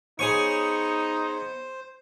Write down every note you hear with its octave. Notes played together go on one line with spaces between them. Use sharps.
B3 D#4 G#4 C5 C#5 G#5 C#6